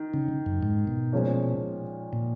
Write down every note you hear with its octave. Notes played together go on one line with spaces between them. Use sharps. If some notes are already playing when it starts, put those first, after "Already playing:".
Already playing: D#3
C#3
F#2
G#2
B2
A#2 F3 G#3 C#4
A#2